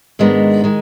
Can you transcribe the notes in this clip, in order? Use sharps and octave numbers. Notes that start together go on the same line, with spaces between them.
G#2 D#3 G#3 B3 D4
D#3 G#3